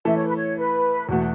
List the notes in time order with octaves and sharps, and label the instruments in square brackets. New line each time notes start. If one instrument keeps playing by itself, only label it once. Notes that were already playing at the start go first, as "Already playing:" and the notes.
[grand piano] E3 A3 E4 A4 [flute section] E5
[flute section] C#5
B4
C#5
B4
[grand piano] E2 B2 A3 [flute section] F#4